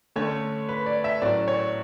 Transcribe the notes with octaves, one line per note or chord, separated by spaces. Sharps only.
D3 A3 C#4 C#5
B4
D5
E5
A2 F#3 C#4 D5
C#5